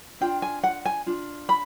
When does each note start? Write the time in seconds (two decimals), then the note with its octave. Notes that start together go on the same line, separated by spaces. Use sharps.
0.21 D4 F4 G5
0.42 G#5
0.64 F#5
0.85 G#5
1.06 D4 F4
1.49 B5